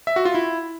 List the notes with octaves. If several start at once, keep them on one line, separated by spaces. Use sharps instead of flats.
E5
F#4
F4
E4